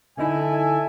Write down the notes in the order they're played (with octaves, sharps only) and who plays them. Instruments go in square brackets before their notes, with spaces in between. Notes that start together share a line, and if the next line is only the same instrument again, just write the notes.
[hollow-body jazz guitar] D3 D#4 E4 [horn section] A4 E5 G#5